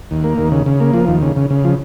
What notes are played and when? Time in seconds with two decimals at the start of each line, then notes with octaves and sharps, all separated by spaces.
0.11 D#2
0.24 A#3
0.38 D#2
0.52 C#3
0.66 C#3
0.80 A#3
0.94 F3
1.08 D#2
1.22 C#3
1.36 C#3
1.50 C#3
1.64 F3